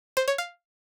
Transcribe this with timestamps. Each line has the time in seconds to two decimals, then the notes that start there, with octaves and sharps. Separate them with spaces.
0.17 C5
0.28 C#5
0.38 F5